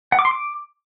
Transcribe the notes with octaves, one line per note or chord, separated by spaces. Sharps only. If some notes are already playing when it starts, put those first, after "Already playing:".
F#5
D6
C6
D6